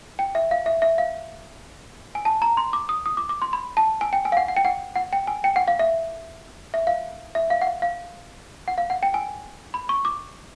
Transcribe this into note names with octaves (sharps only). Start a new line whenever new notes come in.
G5
E5
F5
E5
E5
F5
G#5
A5
A#5
C6
D6
D#6
D#6
D6
D6
C6
B5
A5
G#5
G5
G#5
F5
F#5
F#5
G5
F#5
F#5
G5
G#5
G5
F#5
F5
E5
E5
F5
E5
F5
F#5
F5
F5
F#5
F5
F#5
G5
G#5
B5
C#6
D6